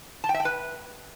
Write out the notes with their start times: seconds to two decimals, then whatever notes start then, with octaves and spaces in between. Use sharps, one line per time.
0.24 A5
0.29 G5
0.34 E5
0.40 G5
0.45 B4